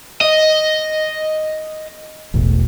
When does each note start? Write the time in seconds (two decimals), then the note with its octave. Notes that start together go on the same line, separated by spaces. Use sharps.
0.21 D#5
2.34 E1 A1